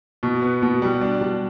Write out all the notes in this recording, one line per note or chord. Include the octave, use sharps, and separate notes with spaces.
B2
B3
B2
G3
D4
G3